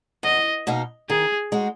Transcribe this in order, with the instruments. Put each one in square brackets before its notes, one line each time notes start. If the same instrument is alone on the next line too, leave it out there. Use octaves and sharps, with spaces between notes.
[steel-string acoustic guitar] E2 [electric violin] D#5
[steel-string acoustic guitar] B2 A#3 D#4
[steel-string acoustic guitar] D#3 [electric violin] G#4
[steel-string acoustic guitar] G#3 D#4 F#4